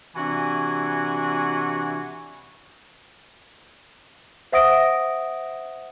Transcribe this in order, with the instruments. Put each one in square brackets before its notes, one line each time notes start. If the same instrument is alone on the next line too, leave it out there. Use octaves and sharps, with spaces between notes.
[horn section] C3 E3 D4 F#4 E5 G#5
[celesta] C5 E5 F#5 D#6 A#6 D7